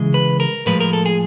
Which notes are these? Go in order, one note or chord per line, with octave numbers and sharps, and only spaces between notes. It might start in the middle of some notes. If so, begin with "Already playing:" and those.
Already playing: C#3 E3 G#3
B4
A#4
A2 F3 G#3 B4
A#4
A4
G#4